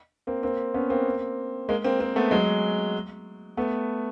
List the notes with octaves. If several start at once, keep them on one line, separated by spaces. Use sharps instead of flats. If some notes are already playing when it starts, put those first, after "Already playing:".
A#3 C4
A#3 C4
B3 C#4
A#3 C4
G#3 A#3
A#3 C4
A#3 C4
A3 B3
F#3 G#3
A3 B3